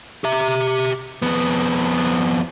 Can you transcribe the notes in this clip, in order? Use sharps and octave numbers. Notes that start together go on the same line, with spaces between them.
G4 E5
F2 B3